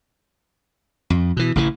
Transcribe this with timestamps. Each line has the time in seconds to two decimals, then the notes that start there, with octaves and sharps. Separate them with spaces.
1.10 F2
1.37 B2 E3
1.56 A1 C#3 E3